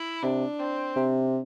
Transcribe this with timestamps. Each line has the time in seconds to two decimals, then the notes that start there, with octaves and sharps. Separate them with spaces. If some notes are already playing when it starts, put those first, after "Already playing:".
Already playing: E4
0.23 C3 D4
0.59 C4
0.96 C3